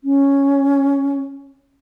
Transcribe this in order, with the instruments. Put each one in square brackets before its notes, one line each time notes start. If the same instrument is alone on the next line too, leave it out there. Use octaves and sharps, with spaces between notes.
[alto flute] C#4